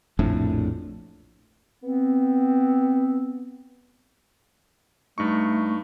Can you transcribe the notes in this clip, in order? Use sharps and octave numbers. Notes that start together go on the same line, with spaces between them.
A#1 F2 A2 D4
B3 C4
G2 A3 D#4 C#6